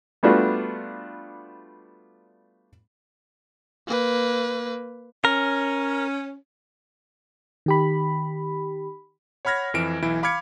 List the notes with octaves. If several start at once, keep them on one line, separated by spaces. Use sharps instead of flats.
G3 A3 B3 D4 F4 F#4
A#3 B4
C#4 A#4
D#3 G4 B5
C#5 F#5 B5 F6 G#6 A#6
F2 E3 D7 E7
B1 E3 E4 D7
F5 B5 D6 F6 G#6 C#7